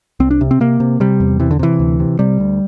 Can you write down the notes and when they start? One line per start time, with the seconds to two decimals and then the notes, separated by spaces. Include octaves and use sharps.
0.20 C2 C4
0.31 D4
0.41 C3
0.51 C4
0.60 C3 A#3
0.80 C3
1.00 C3 G3
1.20 E2
1.40 C3 E3
1.51 D3
1.59 C3 E3
1.80 D2
2.00 C3
2.19 C3 G3
2.40 D2